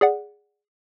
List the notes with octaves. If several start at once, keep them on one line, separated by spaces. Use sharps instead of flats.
G#4 D5 F#5